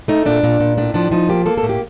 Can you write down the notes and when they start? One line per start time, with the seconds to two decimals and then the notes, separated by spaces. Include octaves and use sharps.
0.08 A3 D#4
0.25 A#2 D4
0.43 A#2
0.60 A#2
0.78 A2 D4
0.94 F3 D4
1.11 F3 D#4
1.29 A#3 G4
1.46 A#3 A4
1.58 A4
1.63 A2
1.69 G4